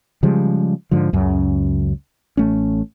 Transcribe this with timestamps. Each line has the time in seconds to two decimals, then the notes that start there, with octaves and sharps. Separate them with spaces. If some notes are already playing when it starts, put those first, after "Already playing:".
0.23 C#3 F3 G3 G#3
0.91 G#2 D3 F3
1.13 C#2 F#2 C#3
2.37 A1 A3 C#4